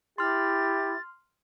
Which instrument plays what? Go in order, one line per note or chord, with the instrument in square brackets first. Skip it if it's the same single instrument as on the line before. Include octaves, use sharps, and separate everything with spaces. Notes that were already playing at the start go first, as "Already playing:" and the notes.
[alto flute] E4 [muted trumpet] G4 [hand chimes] C6 F6 [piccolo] A6